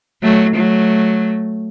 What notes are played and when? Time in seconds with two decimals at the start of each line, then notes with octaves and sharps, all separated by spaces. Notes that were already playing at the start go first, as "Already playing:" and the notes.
0.23 F#3 A3
0.56 F#3 A3